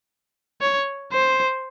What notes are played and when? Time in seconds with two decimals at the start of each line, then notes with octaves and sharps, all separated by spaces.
0.62 C#5
1.12 C5